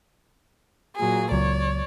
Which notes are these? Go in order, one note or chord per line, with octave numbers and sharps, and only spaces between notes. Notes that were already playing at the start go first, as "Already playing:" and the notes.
A#2 F#3 G#4
C#2 F#3 C#5 D5